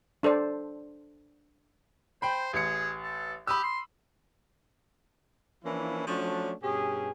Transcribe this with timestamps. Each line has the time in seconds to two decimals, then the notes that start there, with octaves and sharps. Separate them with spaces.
0.23 D4 A4 C5 D5
2.22 C5 G5 B5
2.53 A1 G#4 C#7
3.02 A4
3.47 G4 B5 D#6 E6
3.63 C6
5.64 E3 F3 A#3 C#4 D4 E4
6.07 F3 F#3 A3 C#4 D4
6.62 G2 B2 C#4 G4 G#4